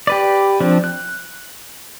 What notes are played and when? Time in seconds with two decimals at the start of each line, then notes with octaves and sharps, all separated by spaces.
0.07 G4 B4 D5
0.61 F3 C4 D4
0.84 F#6